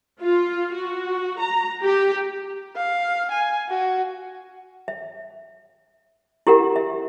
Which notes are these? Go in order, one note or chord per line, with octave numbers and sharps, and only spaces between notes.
F4
F#4
A#5
G4
F5
G#5
F#4
E5
E4 G4 A#4 F#5
E5